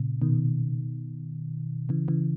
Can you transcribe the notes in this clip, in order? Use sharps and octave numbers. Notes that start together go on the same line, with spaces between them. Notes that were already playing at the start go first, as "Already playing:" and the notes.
Already playing: A#2 C#3
B2 D#3
C#3 E3
C#3 E3